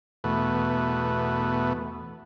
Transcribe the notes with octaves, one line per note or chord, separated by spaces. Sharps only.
E2 B2 A3 B4